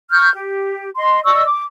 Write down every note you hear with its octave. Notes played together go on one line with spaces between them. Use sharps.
C#6 F6 G6
G4
D#5 C6
D5 D#5 C#6 E6
D6